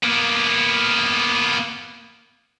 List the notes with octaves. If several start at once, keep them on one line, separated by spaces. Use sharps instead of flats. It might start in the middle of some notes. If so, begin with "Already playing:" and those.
A#3 B3